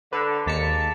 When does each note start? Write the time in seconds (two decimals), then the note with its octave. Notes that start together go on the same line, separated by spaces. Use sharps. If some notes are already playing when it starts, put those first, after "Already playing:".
0.13 D3 B4
0.46 D#2 G#3 A#3 A5 B6 C#7